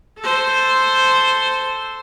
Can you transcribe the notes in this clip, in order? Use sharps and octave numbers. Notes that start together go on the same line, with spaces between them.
A4 C5